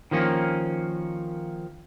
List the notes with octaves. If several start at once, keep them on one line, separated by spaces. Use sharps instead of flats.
D#3 F3 A#3 C#4